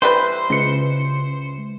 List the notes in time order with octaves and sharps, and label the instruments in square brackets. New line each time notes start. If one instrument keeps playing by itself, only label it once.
[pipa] E3 G3 B4 [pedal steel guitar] C5
[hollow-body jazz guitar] C#2 [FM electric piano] C#3 C#7